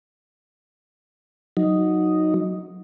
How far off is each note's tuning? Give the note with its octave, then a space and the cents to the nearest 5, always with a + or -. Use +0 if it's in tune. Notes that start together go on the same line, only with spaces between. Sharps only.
F#3 -10 D#4 +0